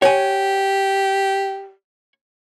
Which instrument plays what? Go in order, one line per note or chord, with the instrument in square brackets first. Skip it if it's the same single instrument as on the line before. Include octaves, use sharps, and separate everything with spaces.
[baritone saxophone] G4 [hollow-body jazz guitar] C#5 F#5 G#5